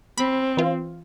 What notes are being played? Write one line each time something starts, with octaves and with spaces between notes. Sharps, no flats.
C4 B5
E3 F4